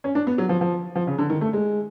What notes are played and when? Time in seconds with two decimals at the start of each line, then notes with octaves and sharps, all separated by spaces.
0.04 C#4
0.15 D4
0.27 B3
0.38 F#3
0.49 F3
0.61 F3
0.96 F3
1.07 C#3
1.18 D3
1.30 D#3
1.41 A3
1.53 G#3